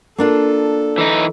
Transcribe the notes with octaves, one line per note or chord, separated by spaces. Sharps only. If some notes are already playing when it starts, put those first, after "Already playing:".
A#3 D4 F4 A4
E3 D#4